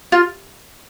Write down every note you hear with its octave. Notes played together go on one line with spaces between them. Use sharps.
F4